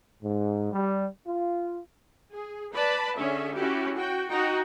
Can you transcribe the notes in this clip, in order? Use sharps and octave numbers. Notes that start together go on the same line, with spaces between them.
G#2
G3
F4
G#4
B4 D5 A5 B5
D3 C#4 G#4 E5
C#4 E4 F#4 G4
F#4 G5
D#4 F#4 G5